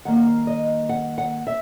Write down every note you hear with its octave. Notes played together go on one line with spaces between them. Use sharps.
D#3 G3 A#3 F#5
F#5
F5
D#5
F#5
F#5
E5